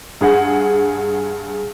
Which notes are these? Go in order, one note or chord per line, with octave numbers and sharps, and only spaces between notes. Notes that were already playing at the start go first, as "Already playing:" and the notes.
G2 G#4 F#5